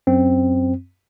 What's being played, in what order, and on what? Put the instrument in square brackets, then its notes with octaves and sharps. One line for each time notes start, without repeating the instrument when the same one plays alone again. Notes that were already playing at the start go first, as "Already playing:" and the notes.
[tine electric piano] F#2 C4